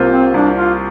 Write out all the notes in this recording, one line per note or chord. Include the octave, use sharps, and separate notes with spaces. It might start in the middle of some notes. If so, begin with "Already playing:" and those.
Already playing: C2 C3 A#3 F4 C5
C4
C2 D4
F4